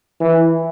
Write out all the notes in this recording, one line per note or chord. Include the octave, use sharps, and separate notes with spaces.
E3